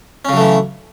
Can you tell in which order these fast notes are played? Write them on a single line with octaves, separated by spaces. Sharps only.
C#4 C#3 F#3 A3 E3